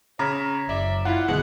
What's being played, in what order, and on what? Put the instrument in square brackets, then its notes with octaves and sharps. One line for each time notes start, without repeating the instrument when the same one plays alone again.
[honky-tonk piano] C#3 [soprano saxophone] C#5 [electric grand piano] A#5 B6
[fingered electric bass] F#1 [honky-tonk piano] D5 [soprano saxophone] E5
[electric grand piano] E4 F#5 [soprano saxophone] F4
[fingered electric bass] F#1 D3 [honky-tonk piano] B2 E3 G#3 [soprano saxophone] F#5